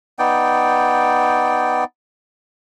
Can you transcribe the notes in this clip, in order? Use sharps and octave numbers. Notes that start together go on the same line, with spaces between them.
B3 D#4 D5 G5